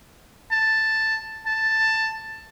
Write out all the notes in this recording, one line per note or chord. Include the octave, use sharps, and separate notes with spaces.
A5
A5